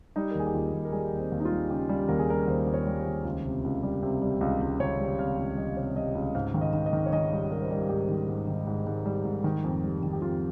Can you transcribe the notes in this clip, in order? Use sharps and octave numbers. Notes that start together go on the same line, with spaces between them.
G3 D#4
A#4
D#2 G#4
G4
D#2 F4
D#2
A#4
G3 G#4
D#2
C4
D#2
D#4
F4
G3
C#3 G4
G3
D#2 A#4
G#4
G3 A#4
D#2 C5
D#2
C#5
G3
C5
D#2
C#2
C3
C#2
G3
C3
G3
C#2
C#2
C#2 C#5
G3
C3 F5
C#2
G3 D#5
C3 C#5
G3 D#5
C#2
G#2 F5
D#3
D#5
D#3
D#5
D#3
C#5
D#3 D#5
G3
G3 A#4
C5
G3 A#4
G#2 G4
D#3
G#2
D#3
G#2
G#2
G3
G#2
D#3
F2
G3
D#3
G4
F2 F4